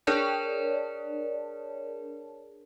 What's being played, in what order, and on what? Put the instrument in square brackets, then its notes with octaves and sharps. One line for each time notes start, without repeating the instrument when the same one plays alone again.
[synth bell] D4 G#4 A#4 C#5 D5 A5